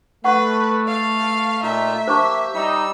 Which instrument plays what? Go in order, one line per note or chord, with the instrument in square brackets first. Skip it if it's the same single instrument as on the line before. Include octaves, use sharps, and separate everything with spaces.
[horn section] A3 [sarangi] B4 [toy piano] F#5 C#6
[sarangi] F5
[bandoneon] A#2 D#4 F4 [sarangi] E5
[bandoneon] A#3 G4 [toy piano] C5 A5 C#6
[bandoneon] G3 E6 [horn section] D#4